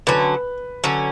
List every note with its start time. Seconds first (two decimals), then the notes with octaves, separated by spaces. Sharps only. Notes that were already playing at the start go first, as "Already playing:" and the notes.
0.07 D3 F#3 C#4 B4
0.84 D3 F#3 C#4